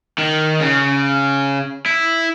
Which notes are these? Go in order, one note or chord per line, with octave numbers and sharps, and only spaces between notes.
D#3
C#3
E4